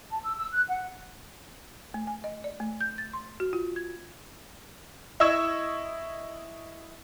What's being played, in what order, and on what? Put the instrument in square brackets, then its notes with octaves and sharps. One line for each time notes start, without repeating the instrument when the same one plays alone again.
[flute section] A5
E6
E6
F#6
F#5
[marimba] A3
G#5
D#5
D5
A3
G6
A6
C6
F#4
F4
G#6
[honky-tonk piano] E4 D#5 C#6 E6 G#6 E7